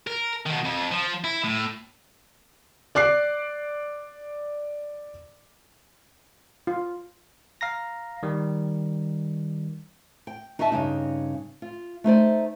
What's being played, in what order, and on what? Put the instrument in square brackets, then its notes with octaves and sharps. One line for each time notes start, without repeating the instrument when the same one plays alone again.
[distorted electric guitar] A#4
B2 D#3
F2
F3
E4
A2
[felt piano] D5 D6 F#6 C7
[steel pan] F4
[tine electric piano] F5 A#5 A#6
D#3 G3
[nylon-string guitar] G5
D#4 F#4 D#5 E5 A5
G2 C#3 D#4
F4
A3 D#4 C5 D5